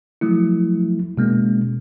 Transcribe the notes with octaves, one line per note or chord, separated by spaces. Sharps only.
F3 F#3 A3 E4
B2 G#3 A#3 C#4